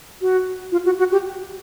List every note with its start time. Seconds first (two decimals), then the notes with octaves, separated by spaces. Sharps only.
0.21 F#4
0.72 F4
0.85 F#4
0.99 F#4
1.12 G4